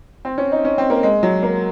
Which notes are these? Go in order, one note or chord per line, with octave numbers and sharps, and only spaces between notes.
C4
C#4
D#4
C#4
C4
A#3
G#3
F#3
A#3